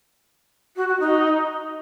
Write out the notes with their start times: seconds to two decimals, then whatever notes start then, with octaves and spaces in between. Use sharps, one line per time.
0.76 F#4
0.88 F#4
0.99 D#4